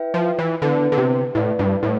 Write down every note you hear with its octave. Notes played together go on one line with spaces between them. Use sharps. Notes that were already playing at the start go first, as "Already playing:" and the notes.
Already playing: E4 B4 E5 G5
F3
E3
D3 B3 E4 B4
D3
C3
A2 E4 B4 D5 F5
G2
A2